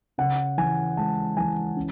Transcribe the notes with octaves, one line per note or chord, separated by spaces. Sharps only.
C#3 F#5
E3 G#5
G#3 A5
E3 G#5
C#4